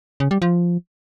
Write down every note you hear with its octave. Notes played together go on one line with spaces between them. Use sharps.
C#3
G3
F3